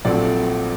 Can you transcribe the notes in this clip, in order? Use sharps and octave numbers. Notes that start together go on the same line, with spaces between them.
A#1 A#2 F#3 A3 C4 D5